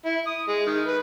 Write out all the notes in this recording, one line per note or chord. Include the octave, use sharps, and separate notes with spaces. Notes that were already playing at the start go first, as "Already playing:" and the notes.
E4
D#6
G#3
D#3
B4